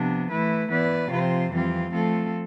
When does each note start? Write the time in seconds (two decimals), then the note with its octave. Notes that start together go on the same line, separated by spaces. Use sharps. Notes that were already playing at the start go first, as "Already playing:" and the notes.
Already playing: C3 F3 B3 D4
0.30 E3 A3 E4 B4
0.70 E3 B3 E4 B4 D5
1.10 C3 F3 C4 F4 C5
1.50 F2 E3 G3 C4 F4
1.91 F3 A3 C4 F4 A4